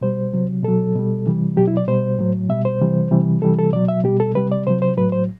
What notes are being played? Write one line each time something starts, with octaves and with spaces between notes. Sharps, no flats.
B2 G3 C5
C3 F#3
B2 F#3 A4
B2 G3
C3 E3 G3
B2 F#3 G4
E4
D5
B2 G3 C5
A2 F#3
B2 G3 E5
C5
C3 E3 G3
C3 E3 G3
C3 E3 G3 A4
A4
B2 F#3 D5
E5
B2 G3 G4
A4
C3 G3 B4
D5
C3 F#3 C5
C5
A2 F#3 B4
C5